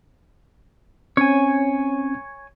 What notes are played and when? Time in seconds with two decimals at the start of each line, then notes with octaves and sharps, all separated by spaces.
1.17 C4 C#4 C#5 G#5